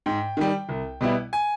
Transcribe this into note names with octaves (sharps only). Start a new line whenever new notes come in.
G#2 G5
D#3 G3
C2
B2 G3 B3 E4
G#5